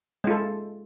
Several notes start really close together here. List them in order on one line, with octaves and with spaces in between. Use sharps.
G#3 F4 A4